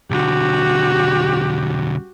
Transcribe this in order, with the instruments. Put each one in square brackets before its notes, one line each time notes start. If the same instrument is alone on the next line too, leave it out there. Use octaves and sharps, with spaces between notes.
[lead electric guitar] B1 D3 [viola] F#4 G4